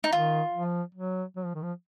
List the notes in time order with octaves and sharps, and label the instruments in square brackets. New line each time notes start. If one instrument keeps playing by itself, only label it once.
[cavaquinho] D#4
[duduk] D#3 [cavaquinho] F4
[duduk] F3
F#3
F#3
F3
D#3
F3